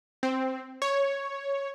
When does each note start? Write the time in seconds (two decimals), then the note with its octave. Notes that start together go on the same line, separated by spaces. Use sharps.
0.23 C4
0.82 C#5